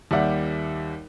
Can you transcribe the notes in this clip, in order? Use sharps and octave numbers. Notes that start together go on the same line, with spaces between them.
D#2 G3 G4 D5 E5 F#5